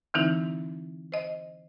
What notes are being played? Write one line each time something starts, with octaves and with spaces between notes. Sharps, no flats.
D3 E3 C4 D#4 E4
C5 D#5